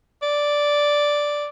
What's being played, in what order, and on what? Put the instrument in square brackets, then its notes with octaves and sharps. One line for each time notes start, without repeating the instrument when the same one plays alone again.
[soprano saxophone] D5